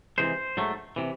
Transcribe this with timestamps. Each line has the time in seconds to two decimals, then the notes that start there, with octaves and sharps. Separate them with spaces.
0.18 C3 E3 G#3 C5
0.57 G#2 F#3 A3
0.96 C3 E3